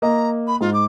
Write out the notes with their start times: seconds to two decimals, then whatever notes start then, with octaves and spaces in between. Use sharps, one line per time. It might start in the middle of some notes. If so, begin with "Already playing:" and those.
0.02 A#3 D#5 A#5
0.47 B5
0.61 G#2 F4
0.73 D6